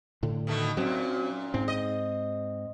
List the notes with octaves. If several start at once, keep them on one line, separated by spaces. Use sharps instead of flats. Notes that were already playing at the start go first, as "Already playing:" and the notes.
A2 D3
B2 D#3 A3
F#2 A#2 F#3 C4
G#2 C4
D#5